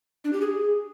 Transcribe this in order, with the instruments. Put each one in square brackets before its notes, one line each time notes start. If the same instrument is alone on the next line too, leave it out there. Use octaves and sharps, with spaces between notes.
[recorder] D4
G4
G#4